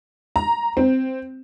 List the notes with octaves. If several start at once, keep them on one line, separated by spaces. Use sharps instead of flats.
A#5
C4